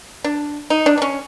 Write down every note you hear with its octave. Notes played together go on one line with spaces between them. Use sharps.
D4
D#4
D4
D4
C#4